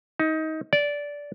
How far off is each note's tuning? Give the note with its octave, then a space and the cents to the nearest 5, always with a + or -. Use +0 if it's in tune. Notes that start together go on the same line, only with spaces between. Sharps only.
D#4 +25
D5 -15